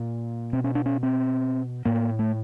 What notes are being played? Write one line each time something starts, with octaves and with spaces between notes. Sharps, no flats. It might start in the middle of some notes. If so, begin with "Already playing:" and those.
Already playing: A#2
B2 C4
C#4
D4
C#4
C4
A2 A#3
A3